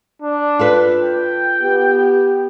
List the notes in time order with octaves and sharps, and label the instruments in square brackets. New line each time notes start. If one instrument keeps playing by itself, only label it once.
[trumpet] D4
[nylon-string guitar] F4 A4 B4
[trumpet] G5
[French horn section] B3 G4